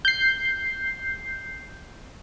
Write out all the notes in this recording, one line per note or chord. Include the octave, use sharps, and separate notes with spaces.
G6 C7